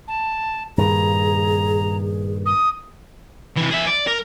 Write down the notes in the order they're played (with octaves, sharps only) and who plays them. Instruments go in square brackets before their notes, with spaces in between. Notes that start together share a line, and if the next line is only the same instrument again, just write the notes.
[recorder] A5
[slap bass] G2 A#2 D#3 [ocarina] G#4 [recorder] A#5
[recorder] D#6
[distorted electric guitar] C3 E3
G#4 E5
D5
A#4